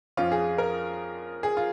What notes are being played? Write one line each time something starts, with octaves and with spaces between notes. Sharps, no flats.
F2 F3 C#4 F4
G#4
A#4
G#4
F4